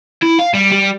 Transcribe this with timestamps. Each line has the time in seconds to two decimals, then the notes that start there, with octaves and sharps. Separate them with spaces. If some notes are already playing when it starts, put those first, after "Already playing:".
0.23 E4
0.39 F5
0.54 G3
0.72 G3